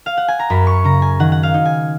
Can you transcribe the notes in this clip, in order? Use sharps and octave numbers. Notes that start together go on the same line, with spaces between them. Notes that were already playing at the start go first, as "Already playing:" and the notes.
F5
F#5
G#5
A#5
F#2 B5
C#6
C#3 A#5
G#5
D#3 F#5
F#5
F5
D#4
G#5